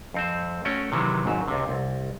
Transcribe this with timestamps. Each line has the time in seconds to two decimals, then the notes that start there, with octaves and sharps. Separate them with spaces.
0.14 F2 C4 C5
0.65 A3 C#4 F#4 C#5 G5
0.92 C3 D#3 E3 F#3 G#3
1.26 G#1 G#2 F#3
1.48 C#2 C3
1.69 C2